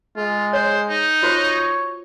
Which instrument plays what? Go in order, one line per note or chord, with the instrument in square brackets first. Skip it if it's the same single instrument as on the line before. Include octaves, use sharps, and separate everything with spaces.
[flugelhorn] G#3 [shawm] F4
[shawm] C5 [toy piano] C#5
[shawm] D#4
[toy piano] F4 F#4 C5 [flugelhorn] C#5